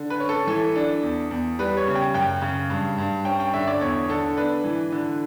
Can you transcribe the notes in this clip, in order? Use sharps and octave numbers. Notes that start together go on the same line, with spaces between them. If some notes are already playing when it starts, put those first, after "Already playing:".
Already playing: D3
B4
C#4
A4
E3 A4
D4
E2
E2
G3 B4
C#5
C#3
G5
F#2 G5
C#3
G2
G2
C#4 G5
G5
D3 E5
D5
E2 C#5
D3 A4
D4 B4
E3
D3